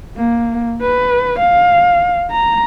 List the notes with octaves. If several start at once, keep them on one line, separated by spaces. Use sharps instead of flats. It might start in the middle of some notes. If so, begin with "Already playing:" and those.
A#3
B4
F5
A#5